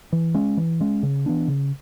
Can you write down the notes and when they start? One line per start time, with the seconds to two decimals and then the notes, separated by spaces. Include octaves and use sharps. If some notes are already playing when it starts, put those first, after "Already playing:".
0.12 E3
0.34 G#3 C#4
0.57 E3
0.80 G#3 C#4
1.03 C#3
1.26 E3 B3 D4
1.48 C#3